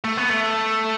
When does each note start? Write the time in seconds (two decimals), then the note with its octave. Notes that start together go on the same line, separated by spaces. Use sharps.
0.04 A3
0.17 B3
0.30 A3